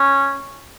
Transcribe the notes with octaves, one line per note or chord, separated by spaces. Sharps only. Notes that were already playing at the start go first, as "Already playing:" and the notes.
Already playing: C#4